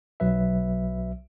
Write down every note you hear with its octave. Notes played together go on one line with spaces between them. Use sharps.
B1 F#3 B4 E5